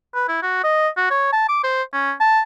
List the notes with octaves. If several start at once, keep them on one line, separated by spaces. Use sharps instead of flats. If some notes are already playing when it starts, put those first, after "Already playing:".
B4
E4
F#4
D#5
F#4
C#5
A5
D6
C5
C#4
A5